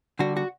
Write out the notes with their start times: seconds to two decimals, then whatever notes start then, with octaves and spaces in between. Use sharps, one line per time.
0.19 D3 G3 F#4
0.37 F#4